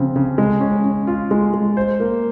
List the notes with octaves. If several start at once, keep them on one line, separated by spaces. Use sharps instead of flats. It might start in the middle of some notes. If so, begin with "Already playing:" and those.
Already playing: C#3 F3 C4
C#3
G#3
C#4
C#4
F4
G#3
G#3
C5
A#3